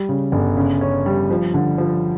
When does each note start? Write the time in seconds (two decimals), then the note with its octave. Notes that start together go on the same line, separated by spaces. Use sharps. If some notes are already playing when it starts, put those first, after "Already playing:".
Already playing: G3
0.09 C#3
0.32 G1
0.57 C#3
0.81 C#4
1.06 G3
1.30 F3
1.54 D3
1.78 F3